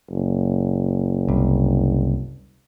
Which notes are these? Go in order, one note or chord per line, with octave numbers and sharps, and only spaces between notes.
F#1
C2